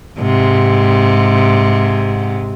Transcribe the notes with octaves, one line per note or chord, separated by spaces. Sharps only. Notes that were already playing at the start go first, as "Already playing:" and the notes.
G#2 C3